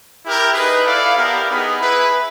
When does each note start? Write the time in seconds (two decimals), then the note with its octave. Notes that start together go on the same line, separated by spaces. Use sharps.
0.23 E4 G4 A#4
0.54 D#4 G#4 B4
0.85 E4 A4 D5 F5
1.16 B3 E4 G4 A#4
1.49 B3 D#4 G#4 B4
1.80 E4 G#4 B4